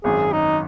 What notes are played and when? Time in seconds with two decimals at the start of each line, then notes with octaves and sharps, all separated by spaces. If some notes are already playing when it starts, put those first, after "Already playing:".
0.04 G#1 F#2 D#3 G#4
0.33 D#4